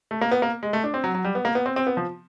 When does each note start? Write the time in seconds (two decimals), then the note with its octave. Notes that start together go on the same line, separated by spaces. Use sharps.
0.11 A3
0.21 A#3
0.31 B3
0.42 A#3
0.63 G#3
0.73 A3
0.84 D4
0.94 C4
1.04 F#3
1.14 F#3
1.25 G3
1.35 B3
1.45 A#3
1.55 B3
1.66 C4
1.76 C4
1.87 B3
1.97 F3